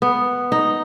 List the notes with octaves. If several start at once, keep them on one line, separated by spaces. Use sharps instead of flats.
B3
D#4